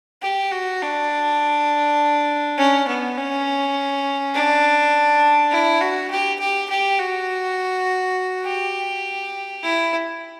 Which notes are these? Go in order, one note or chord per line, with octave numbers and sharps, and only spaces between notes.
G4
F#4
D4
C#4
B3
C#4
D4
E4
F#4
G4
G4
G4
F#4
G4
E4